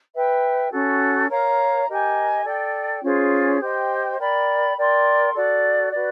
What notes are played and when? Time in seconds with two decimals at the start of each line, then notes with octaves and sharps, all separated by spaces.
0.13 B4 E5 G5
0.71 C#4 F#4 A4
1.29 A#4 C#5 F5 A#5
1.87 G4 A#4 D#5 G#5
2.44 A4 D5 G5
3.02 C#4 F4 G#4 C5
3.60 G4 C5 D#5 G5
4.18 A#4 D5 G5 B5
4.77 A#4 D5 G5 C6
5.34 F#4 A4 D5
5.91 F#4 B4 D5